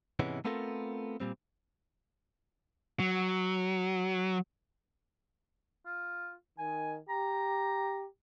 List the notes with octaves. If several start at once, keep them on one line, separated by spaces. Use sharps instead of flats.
G#2 C3 E3 G#3 B3 C#4
A3 B3 C4 F4 A4 A#4
A#2 G3 C4
F#3
F4
D#3 G#5
G4 A#5